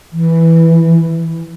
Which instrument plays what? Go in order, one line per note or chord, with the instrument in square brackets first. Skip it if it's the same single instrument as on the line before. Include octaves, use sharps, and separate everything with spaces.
[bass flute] E3